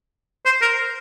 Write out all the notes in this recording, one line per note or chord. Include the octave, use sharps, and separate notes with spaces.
C5
A#4